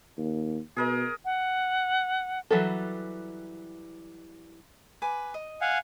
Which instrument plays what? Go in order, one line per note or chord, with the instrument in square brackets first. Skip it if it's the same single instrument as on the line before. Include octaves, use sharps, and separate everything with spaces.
[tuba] D#2
[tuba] B2 [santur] G#4 A#4 D#5
[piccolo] F#5
[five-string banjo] E3 F#3 G3 A4
[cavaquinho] B4 G#5 D6
D#5
[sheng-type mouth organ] F5 F#5 G#5